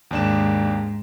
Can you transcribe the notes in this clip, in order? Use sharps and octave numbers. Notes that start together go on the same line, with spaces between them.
D#2 G#2 D4 E7